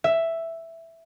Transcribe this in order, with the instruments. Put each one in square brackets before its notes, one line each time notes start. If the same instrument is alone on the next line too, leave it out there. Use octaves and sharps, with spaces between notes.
[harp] E5